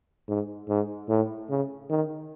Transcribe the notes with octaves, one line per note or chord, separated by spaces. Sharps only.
G#2
G#2
A2
C#3
D#3